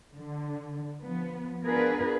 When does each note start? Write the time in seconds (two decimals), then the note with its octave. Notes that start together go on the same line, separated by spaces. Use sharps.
0.13 D3
1.02 F3 B3
1.64 B3 D4 F4 G#4 A#4 B4